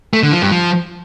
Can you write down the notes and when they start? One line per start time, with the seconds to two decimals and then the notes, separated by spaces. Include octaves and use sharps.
0.13 A3
0.23 D3
0.32 F3
0.42 G2
0.51 F3